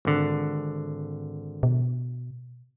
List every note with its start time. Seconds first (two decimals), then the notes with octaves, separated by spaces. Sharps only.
0.05 G#1 D3
1.63 B2